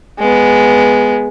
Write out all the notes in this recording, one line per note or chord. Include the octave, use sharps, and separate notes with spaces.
G#3 B3